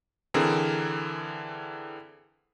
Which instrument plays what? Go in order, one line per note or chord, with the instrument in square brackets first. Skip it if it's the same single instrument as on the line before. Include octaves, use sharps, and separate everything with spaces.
[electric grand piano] D3 E3 C4 G#4 A#4